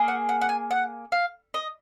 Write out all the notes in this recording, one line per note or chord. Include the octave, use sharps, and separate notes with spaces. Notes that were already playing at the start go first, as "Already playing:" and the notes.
Already playing: A#3 G#4
F#5
F#5
F#5
G#5
F#5
F5
D#5